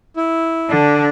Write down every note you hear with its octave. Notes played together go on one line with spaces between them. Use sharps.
E4
D3 D4